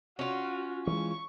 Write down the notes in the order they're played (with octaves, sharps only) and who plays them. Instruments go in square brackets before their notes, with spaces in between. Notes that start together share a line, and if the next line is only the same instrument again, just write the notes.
[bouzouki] C#4 F4 [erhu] F#4
[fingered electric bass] E3 G#3 [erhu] C#6